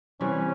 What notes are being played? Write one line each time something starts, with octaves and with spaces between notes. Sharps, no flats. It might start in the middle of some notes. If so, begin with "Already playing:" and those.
C3 E3 G3 C#4